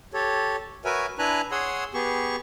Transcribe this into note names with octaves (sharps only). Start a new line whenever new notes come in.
G4 A4 C#5
F#4 A#4 B4 C#5 E5 G#5
D4 E4 B4 G#5 A#5 F#6
G#4 C#5 F#5 C6 D#6 E6
B3 G4 G#4 C#6